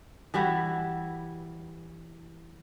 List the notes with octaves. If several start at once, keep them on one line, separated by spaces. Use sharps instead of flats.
E3 G3 E4 F#4